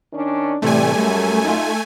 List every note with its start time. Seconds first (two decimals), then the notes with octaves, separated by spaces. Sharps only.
0.13 D#3 C#4 D4
0.62 E2 A2 C3 E3 G3 A3 G#5
0.97 F#2 G3 G#3
1.45 D#4 F4